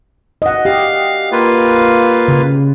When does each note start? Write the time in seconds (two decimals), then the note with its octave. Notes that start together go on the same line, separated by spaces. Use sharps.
0.42 D#5 F#5
0.65 G4 F5
1.32 A#3 F4 B4
2.28 C#3